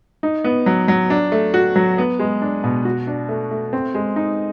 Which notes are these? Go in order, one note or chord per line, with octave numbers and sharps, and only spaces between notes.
D#4
B3
F#3
F#3
D4
A3
F#4
F#3
B3
G#3
D4
B2
F#4
D4
A3
A3
C4
G#3
D#4